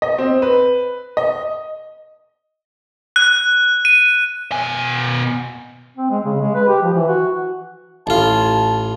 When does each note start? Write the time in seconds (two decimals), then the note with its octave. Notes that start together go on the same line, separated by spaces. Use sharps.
0.02 D#5
0.18 C4
0.42 B4
1.17 D#5
3.16 F#6
3.85 D#7
4.52 B2 G#5
5.97 C4
6.10 G#3
6.25 C#3
6.41 G#3
6.55 B4
6.68 G4
6.82 F3
6.94 E3
7.08 F#4
8.07 A1 F4 A5